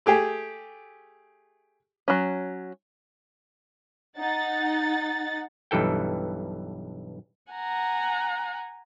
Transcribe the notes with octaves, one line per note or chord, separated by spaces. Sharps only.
A3 G4 G#4
F#3 C#4
D#4 F#5 A6
B1 G2 E3 A4 G5
F#5 G#5 A#5